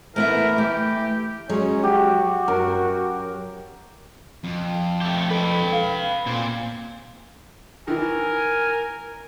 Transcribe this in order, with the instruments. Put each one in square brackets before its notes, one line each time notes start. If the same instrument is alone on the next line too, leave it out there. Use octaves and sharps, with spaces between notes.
[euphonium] E3 [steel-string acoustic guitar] A3 B3 E5 [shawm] A#4
[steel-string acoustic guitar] A3 [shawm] G4
[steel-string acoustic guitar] F#3 G#3 [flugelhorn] C#4
[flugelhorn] F#4 [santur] G4
[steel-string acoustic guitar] F#2 [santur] A#4
[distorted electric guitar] F2
[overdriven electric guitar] A3 G4
[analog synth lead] A4 [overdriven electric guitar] B4 G5
[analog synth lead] F5
[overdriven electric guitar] A#2 [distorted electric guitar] C4 C5
[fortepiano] D#3 E3 [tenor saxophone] A#4 [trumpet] G#5